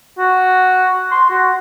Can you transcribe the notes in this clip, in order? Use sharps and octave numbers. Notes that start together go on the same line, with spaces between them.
F#4
C6
F#4